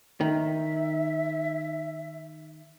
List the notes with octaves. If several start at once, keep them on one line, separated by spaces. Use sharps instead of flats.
D#3 E5